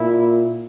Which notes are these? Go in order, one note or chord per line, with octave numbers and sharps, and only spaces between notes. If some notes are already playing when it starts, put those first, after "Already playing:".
Already playing: A#2 E4